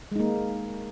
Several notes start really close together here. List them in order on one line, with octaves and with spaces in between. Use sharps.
G#3 D#4 A#3